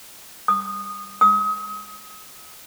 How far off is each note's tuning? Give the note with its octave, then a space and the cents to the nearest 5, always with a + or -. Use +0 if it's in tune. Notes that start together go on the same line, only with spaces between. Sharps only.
D#6 -15
D#6 +35